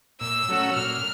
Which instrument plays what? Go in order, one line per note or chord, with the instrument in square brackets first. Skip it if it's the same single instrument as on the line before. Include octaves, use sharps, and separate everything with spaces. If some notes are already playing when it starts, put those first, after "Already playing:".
[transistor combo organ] A#2 [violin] E6
[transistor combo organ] F#3 A3 C#4 F#4
[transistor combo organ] A#2 [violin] F6